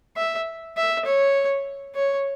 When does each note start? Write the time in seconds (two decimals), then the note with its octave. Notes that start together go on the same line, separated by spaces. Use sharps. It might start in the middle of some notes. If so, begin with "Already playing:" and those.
0.17 E5
0.77 E5
1.05 C#5
1.95 C#5